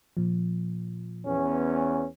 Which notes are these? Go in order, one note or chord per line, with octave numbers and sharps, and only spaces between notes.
A#2 F3
E2 B3 C#4